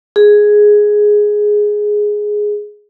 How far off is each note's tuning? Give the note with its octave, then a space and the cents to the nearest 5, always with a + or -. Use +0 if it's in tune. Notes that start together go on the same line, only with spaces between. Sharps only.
G#4 +5